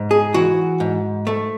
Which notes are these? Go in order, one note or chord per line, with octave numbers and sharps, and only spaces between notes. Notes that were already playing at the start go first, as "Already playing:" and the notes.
Already playing: G#2
G#4
E3 F#4
G#2
A3